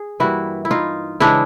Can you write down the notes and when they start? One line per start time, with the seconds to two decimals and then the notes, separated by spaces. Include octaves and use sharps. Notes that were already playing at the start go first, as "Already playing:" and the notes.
Already playing: G#4
0.20 G2 E3 G3 A#3 E4 F#4
0.65 E4
0.71 D#4 F4
1.20 C#3 E3 G#3 D4 E4